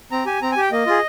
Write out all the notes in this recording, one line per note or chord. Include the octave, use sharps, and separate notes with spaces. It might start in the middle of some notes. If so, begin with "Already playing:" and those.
C4 A#5
G4 G#5
C4 A#5
G#5
G4 G5
A#3 D#5
F4 G#4